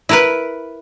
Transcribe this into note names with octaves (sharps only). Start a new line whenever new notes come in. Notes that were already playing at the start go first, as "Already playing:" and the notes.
E4 A#4 B4